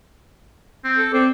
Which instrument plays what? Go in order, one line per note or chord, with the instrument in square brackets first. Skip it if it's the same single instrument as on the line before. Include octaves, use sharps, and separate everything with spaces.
[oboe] C4
[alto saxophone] A4
[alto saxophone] C4 [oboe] D5